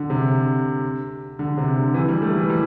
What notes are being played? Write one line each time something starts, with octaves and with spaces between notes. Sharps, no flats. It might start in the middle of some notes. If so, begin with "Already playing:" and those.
Already playing: D3
C3
D3
C3
D3
E3
G3
A3
E3
G3